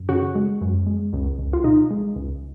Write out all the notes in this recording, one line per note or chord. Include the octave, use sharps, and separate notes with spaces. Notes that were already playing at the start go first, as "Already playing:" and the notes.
Already playing: F#2
C#3 F#4
G#3
F#2
G#3
C#2
C#2
F4
B2 D#4
G#3
C#2